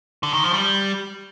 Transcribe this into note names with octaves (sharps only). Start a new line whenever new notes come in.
D3
D#3
F3
G3